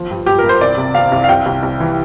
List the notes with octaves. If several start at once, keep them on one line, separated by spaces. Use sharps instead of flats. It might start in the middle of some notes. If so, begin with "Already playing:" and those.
Already playing: F3
G2
G2 G4
A#4
G2
C5
C2 D5
C3
C3 F5
C2
F5
C2 G5
C2
C2
E3